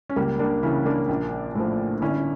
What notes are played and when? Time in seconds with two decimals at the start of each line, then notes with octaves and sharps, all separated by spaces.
0.09 C#4
0.16 C#2 G3 A#3
0.39 A#3 D4
0.63 C#3 E3 C#4 E4
0.86 A#3 D4
1.09 A#1
1.55 A2 F3
2.02 G1 C#4 E4